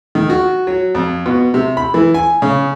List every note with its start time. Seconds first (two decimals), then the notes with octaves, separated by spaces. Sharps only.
0.15 D#3
0.30 F#4
0.67 F#3
0.95 F2
1.26 B2
1.54 C3
1.77 B5
1.94 E3
2.14 G#5
2.42 C#3